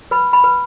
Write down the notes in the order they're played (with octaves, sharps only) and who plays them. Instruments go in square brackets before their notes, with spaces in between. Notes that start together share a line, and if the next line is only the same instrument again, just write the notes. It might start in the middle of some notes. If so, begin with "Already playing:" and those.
[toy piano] B4 B5
B5
B4